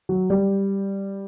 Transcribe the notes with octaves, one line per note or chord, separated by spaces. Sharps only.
F#3
G3